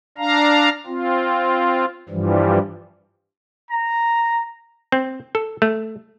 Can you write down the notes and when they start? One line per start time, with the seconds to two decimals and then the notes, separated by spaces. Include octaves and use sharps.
0.18 D4 F5 A#5
0.86 C4 F4
2.09 G2 E3 F3 G3
3.70 A#5
4.92 C4
5.35 A4
5.62 A3